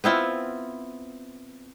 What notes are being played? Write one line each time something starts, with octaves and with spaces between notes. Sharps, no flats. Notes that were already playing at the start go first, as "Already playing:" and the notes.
B3 C4 E4 F4